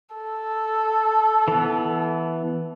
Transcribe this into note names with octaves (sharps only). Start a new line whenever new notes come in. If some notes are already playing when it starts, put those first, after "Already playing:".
A4
E3 B3